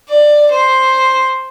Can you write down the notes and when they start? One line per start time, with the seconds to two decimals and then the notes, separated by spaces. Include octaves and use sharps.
0.08 D5
0.50 C5